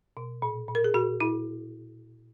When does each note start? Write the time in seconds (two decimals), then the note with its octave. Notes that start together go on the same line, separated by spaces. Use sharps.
0.17 B2
0.42 A#2
0.68 A#2
0.75 A#4
0.84 G#4
0.94 A#2 F#4
1.20 A#2 E4